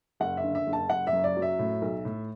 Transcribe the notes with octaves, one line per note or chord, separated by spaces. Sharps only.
F#1 F#5
E5
D3
E5
F#1
A5
F#1 F#5
E5
F#2
D5
F#3
E5
A2
B1
A2